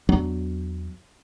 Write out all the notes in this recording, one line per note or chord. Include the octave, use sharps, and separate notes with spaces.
E2 F#3 B3 D4